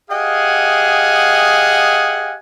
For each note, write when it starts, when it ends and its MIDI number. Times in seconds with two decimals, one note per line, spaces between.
0.10 2.35 67
0.10 2.35 68
0.10 2.35 75
0.10 2.35 77
0.10 2.35 78
0.10 2.35 80